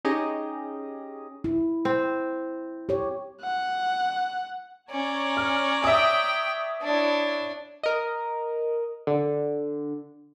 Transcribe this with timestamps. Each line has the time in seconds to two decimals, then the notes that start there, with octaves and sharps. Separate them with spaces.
0.05 C#4 D#4 G4 G#4 D#5
1.44 E4
1.85 C4
2.89 G4 C#5
3.41 F#5
4.91 C#4 C#5 D5 A#5
5.37 F6
5.84 E5 G5 D#6
6.82 D4 E4 C#5 A5
7.83 A#4 D#5
9.07 D3